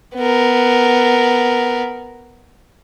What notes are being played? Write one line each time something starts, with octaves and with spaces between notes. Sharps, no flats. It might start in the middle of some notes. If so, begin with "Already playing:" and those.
B3 A#4